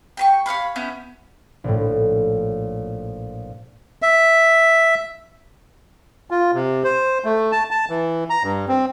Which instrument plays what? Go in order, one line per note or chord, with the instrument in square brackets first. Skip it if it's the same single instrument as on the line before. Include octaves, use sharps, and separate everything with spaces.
[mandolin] G5 B5 C#6
C#5 D5 F5 B5
B3 C#4 E4 G6
[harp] A#1 A2
[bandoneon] E5
F4
C3
C5
A3
A5
A5
E3
A#5
G2
C4